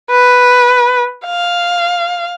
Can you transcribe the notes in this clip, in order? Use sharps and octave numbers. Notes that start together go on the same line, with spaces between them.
B4
F5